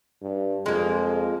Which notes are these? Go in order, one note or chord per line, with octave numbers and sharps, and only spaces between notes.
G2
F2 G#3 A#3